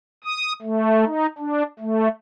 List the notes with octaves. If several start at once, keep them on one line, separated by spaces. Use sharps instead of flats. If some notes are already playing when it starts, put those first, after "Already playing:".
D#6
A3
D#4
D4
A3